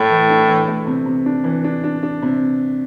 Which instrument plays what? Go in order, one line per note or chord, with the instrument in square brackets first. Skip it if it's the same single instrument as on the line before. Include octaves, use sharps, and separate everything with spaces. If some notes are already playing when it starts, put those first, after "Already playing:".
Already playing: [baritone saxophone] A2 [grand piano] A3
[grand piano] E3
D4
E3
A3
C3
C3
D4
E3
D4
D4
D4
C3